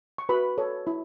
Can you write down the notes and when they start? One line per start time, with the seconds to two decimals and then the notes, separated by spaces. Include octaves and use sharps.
0.18 C#6
0.29 F#4 B4 B5
0.58 A4 C#5
0.87 E4